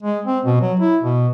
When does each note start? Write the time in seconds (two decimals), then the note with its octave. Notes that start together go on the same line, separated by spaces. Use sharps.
0.03 G#3
0.25 C4
0.45 B2
0.61 F#3
0.80 E4
1.03 B2